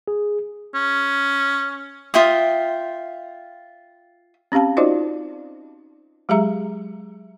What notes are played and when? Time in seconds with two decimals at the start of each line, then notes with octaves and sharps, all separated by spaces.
0.08 G#4
0.75 C#4
2.14 F4 E5 G5 D#6
4.52 C4 C#4 G4 F5 A5
4.77 D#4 F4 F#4 C5 D5 D#5
6.29 F#3 G#3 G4 G#4 E5 A#5